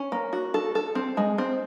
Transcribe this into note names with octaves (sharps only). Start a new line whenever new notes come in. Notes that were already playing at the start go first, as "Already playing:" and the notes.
Already playing: C#4
A#3
F#4
A4
A4
C4
G#3
C4